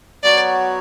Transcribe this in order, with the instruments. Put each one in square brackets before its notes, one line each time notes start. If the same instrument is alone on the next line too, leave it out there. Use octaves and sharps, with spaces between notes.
[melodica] F#3 B3 F#4 C#5 [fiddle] D5